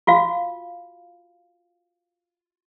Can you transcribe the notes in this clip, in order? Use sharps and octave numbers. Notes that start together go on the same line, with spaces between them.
F4 F#4 F5